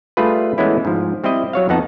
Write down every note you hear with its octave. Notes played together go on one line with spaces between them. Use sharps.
G3 A3 D4 F4 G#4 B4
E3 G#3 A3 B3 C#4 E4
G#2 F3
G3 C4 E4 D#5
F#3 C#5 F5
F2 B3 D#4 F#5 A5